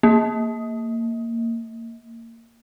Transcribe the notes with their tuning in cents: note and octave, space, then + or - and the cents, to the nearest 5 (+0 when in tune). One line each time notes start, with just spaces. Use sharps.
A#3 -20